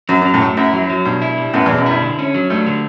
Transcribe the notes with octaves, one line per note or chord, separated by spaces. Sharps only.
F#2 F#3
F#2
F#3
F#2 A2
A3
F#2 E4
F#3
F#3
G2 B2
E4
G3
F#2 A2 B3
E2 B2
F#2
G2 E4
D3
C#4
F#3
G2 A3
D3